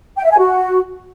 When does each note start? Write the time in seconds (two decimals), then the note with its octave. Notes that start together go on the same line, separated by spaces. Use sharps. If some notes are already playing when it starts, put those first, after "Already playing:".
0.18 G5
0.25 E5
0.31 G#5
0.38 F#4